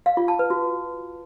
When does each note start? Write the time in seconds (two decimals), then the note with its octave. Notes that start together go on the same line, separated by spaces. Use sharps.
0.06 F5
0.17 F4
0.28 A5
0.39 B4
0.50 F#4